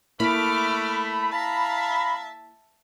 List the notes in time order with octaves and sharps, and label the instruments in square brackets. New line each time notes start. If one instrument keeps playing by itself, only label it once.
[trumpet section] A3 [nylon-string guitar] A#3 E4 [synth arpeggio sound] B5 [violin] D6 F6
[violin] E5 A5 [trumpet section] F5 A#5